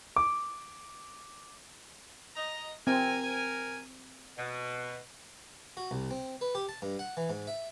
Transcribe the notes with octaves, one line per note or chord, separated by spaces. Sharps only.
D6
D#5 A#5
C4 A#4 G#5
B2
F#4
C2
C4
B4
G4
A5
G2
F#5
E3
G#2
E5